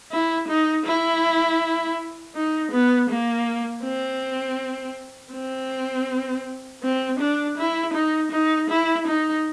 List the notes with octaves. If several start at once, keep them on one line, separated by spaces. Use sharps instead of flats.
E4
D#4
E4
D#4
B3
A#3
C4
C4
C4
D4
E4
D#4
D#4
E4
D#4